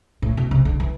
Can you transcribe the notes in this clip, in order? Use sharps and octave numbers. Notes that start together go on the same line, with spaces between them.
A2
B2
C3
D3
E3